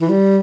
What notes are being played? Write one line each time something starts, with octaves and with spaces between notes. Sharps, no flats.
E3
G3